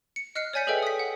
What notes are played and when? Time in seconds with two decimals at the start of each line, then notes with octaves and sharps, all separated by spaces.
0.16 C#7
0.35 D#5 F6 F#6 C7 C#7
0.53 C#5 D5 G#5 G6 B6 C#7
0.67 G#4 A4 B4 D#5 E5 G5
0.83 D#6 B6
0.99 F#5